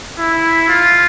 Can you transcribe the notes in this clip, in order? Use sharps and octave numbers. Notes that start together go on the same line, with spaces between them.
E4
F4